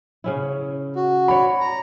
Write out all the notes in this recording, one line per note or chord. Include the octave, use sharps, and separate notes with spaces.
C#3 C#4 E4
F#4
C#5 D5 B5
A#5